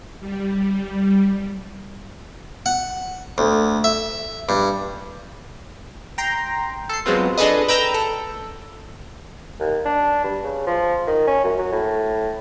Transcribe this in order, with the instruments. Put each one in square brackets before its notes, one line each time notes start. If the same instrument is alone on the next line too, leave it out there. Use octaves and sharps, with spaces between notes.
[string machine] G3
[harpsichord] F#5
D2
E5
G2
[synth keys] G5 A#5 C6
A4 C7
F#3 G#3 B3 C4 F4
D4 G#4 A4 B4 D#5
B4 G5 A#5 E6 G6
A4
[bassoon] D#2
D4
G2
C#3
F3
D#3
C#4
F#2
F#3
A2